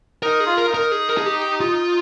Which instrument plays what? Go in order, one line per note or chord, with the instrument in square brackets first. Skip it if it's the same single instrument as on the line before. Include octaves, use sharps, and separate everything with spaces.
[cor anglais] D#4 [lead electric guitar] A#4
[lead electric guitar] G#4
[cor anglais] F4
[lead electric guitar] A#4
[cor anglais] D#4
[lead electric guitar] A#4
G#4
A#4
G#4
G4
F4